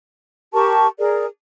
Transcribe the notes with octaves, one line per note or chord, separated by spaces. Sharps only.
G4 A#4 A5 C#6
G#4 A#4 D5